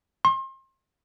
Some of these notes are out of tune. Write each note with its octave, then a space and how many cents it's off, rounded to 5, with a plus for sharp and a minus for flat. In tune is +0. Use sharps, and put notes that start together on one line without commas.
C6 +35